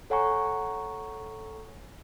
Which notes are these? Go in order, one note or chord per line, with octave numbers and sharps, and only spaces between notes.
A4 C#5 F#5 G#5 A#5 C#6